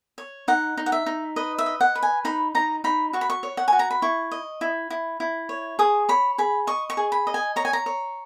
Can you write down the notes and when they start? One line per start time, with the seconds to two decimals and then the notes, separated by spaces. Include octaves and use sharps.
0.18 C#5
0.48 D#4 F#5
0.77 D#4
0.86 F#5
0.92 E5
1.06 D#4
1.36 B4 D#5
1.58 E5
1.66 D#5
1.81 F#5
1.95 B4
2.03 G#5
2.25 D#4 B5
2.55 D#4 A#5
2.84 D#4 B5
3.13 F#4 C#6
3.21 B5
3.30 C#6
3.43 C#5
3.57 F#5
3.68 F#4 G#5
3.79 A#5
3.91 B5
4.02 E4 C#6
4.31 D#5
4.61 E4
4.90 E4
5.20 E4
5.49 C#5
5.79 G#4 D#6
6.09 C#5 B5
6.38 G#4 B5
6.67 D#5 C#6
6.90 C#6
6.97 G#4
7.12 B5
7.27 D#5
7.34 G#5
7.56 C#5 A#5
7.65 G#5
7.73 A#5
7.86 C#5